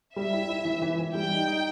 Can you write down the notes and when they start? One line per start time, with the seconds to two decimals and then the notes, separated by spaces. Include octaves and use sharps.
0.16 G3 E5
0.33 E4
0.49 E4
0.65 E3
0.82 E3
0.99 E3
1.15 G3 G5
1.31 D#4
1.48 D#4